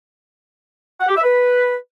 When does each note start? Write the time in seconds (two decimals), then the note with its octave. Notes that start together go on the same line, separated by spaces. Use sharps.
1.01 F#5
1.08 G4
1.16 E5
1.24 B4